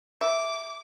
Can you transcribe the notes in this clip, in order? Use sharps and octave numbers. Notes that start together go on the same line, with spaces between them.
E5 D6